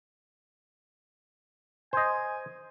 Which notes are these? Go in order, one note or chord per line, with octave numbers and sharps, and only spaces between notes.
C5 D#5 G#5